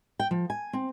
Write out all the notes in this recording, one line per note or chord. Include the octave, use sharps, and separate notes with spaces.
G5
F3
G#5
C4